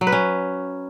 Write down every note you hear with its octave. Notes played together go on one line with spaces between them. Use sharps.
F#3
B4
C#4